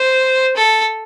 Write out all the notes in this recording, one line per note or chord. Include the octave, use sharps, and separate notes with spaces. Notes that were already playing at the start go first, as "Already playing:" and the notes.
Already playing: C5
A4